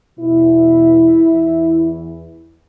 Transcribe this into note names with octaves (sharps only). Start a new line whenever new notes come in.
E2 B2 E4
E2 E3